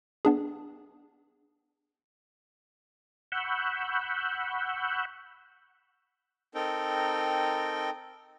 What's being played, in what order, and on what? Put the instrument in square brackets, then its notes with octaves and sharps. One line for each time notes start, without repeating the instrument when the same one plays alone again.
[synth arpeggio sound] B3 D4 G#4
[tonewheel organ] F#5 B5 C#6 E6 F#6 G6
[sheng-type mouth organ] C4 D#4 A4 A#4 G5